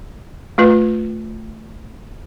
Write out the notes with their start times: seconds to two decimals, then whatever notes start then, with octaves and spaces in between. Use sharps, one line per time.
0.58 A3 F4 B4